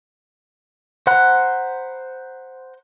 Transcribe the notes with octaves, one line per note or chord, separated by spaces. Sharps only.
C5 F#5 A#5 B5 F#6